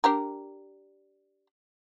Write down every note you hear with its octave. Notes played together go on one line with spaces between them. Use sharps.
D4 G4 A#4